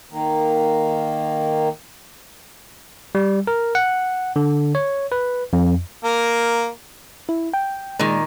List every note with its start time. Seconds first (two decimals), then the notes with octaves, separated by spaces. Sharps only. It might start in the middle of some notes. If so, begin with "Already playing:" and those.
0.11 D#3 A#3
3.15 G3
3.47 A#4
3.75 F#5
4.36 D3
4.75 C#5
5.12 B4
5.53 F2
6.03 A#3 A#4
7.29 E4
7.54 G5
7.99 A#2 D#3 G#3